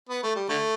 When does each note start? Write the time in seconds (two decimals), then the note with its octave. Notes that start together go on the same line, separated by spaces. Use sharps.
0.09 B3
0.23 A3
0.36 G3
0.49 D3 A3